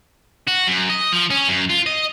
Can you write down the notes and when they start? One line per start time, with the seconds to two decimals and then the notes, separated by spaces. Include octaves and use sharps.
0.48 F#4
0.68 F#2
0.90 D#5
1.13 F3
1.30 C#4
1.48 F#2
1.69 F4
1.86 D#5